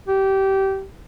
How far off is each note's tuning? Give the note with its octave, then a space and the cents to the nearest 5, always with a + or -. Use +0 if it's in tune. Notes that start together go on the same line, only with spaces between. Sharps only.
G4 -20